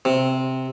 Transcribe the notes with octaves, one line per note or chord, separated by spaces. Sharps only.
C3